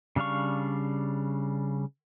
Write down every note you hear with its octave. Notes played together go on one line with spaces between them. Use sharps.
C#3 G3 D4 F5 C#6